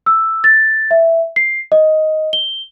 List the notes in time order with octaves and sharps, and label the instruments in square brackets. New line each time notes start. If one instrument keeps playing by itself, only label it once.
[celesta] E6
A6
E5
C7
D#5
G7